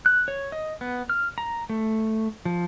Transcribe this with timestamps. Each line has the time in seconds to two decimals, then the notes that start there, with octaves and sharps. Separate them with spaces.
0.06 F#6
0.28 C#5
0.52 D#5
0.81 B3
1.09 F6
1.38 A#5
1.70 A3
2.45 F3